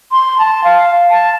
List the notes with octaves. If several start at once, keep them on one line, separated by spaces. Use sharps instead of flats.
C6
A5
F5
A5